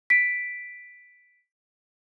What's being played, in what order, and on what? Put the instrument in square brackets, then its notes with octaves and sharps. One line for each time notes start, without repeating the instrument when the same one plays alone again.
[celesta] B6 D7